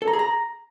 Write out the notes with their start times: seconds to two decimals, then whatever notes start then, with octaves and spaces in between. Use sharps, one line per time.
0.02 A4
0.08 A#5
0.13 G#4
0.19 A#5